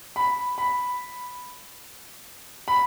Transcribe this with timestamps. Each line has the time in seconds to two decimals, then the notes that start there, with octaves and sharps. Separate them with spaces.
0.16 B5
0.58 B5
2.68 B5